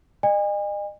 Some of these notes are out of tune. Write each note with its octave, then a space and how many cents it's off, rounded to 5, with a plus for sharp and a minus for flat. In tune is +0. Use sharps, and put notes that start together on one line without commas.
D#5 -40 G#5 -40